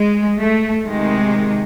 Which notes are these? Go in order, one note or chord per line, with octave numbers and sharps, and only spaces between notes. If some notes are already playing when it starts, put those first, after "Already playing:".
Already playing: G#3
A3
C3 D#3 G#3